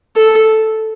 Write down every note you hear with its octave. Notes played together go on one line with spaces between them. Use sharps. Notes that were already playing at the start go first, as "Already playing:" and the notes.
A4